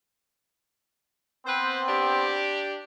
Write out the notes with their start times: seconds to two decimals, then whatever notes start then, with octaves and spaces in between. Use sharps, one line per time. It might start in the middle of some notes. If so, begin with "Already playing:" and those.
1.46 B3 C4 B4 C5
1.88 D4 G4